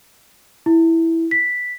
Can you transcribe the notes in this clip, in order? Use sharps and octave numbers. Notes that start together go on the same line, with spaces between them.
E4
B6